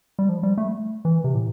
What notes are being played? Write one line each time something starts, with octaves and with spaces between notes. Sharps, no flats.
G3
F3
G3
A3
E3
C3
A2